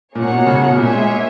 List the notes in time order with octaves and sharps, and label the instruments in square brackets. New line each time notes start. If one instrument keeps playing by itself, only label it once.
[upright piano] A#2 [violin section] A#3 C#4 G#4 C#5 F#5
[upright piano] B2
C#3
B2
[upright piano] A#2 [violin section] G#4 C#5 E5 G#5
[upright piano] G#3
A#3